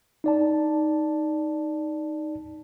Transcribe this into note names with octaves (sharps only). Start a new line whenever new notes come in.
D#4 D5 A5